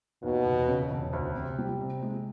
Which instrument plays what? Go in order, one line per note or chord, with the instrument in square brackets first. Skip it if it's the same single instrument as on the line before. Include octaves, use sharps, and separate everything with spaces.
[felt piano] D#2 [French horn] B2
[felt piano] E1
C#3
E1
D2
C3
G3
C3
G#3